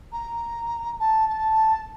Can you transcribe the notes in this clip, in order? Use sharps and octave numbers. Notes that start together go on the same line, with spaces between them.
A#5
A5
A5